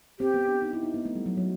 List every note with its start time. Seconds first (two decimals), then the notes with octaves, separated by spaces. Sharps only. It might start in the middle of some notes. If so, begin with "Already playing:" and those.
0.19 C4 G4
0.34 B3
0.48 D4
0.62 D#4
0.73 E4
0.83 D#4
0.94 B3
1.05 A3
1.15 G3
1.26 F#3
1.37 F#3